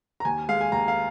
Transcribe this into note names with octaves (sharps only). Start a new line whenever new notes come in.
A#5
D#2 G#5
G#3 F5
G#5
D#2 A#5
F5